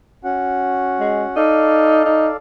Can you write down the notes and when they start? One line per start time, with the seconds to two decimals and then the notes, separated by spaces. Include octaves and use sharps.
0.24 C#4 F#4 F#5
1.00 G#3
1.36 D#4 A4 D5 F5
2.05 D#4